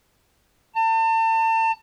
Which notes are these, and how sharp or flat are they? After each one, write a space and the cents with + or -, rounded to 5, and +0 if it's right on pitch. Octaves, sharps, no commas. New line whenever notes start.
A5 +35